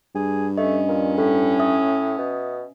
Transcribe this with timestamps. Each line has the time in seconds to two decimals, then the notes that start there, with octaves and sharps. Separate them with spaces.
0.15 G2 G#4
0.57 A3 C#4 D#5
0.89 A#2
1.18 A2 A4
1.60 E5 D#6
2.18 B2